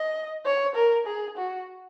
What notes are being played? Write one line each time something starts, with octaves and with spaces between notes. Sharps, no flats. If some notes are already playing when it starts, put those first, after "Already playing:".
Already playing: D#5
C#5
A#4
G#4
F#4